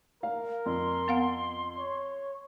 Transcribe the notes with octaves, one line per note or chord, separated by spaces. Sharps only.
A#4 F5
F2 C6
B3 F5 F#5
C#5